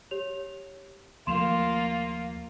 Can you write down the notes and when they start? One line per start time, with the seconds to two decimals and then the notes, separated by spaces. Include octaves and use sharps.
0.11 G4 C#5 F7
1.27 D#2 F3 A3 A#3 F4 C6 E7 F7